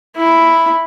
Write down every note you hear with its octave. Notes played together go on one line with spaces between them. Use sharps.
E4